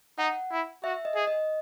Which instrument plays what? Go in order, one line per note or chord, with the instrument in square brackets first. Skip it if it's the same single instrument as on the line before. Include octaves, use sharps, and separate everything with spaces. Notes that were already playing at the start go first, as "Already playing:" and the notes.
[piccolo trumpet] D#4 [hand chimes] F#5
[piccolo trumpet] E4
[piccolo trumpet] F#4 [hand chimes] E5
[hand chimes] D#5
[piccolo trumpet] G#4
[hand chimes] D#5